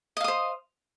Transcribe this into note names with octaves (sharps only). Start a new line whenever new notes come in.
C5 D#5 F5 D#6